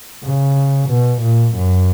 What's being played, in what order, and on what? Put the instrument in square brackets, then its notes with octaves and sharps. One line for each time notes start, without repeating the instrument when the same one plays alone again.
[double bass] C#3
B2
A#2
F#2